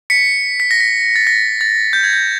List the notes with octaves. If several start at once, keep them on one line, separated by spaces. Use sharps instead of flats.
B6 C#7
B6
A#6
B6
A6
A#6
A6
G6
G#6
G6